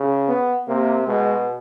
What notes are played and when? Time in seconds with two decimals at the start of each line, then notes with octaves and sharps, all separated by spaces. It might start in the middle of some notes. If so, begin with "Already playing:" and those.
Already playing: C#3
0.29 B3
0.68 C3 A#3
1.07 B2 G#3